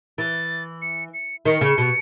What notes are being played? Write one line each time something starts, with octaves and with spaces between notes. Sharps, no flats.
E3 A6
C#7
C#7
D#3 C#7
C#3
B2